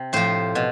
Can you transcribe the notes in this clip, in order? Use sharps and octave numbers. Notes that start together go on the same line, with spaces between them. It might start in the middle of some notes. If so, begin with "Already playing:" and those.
Already playing: C3
A2 F3 C5
B2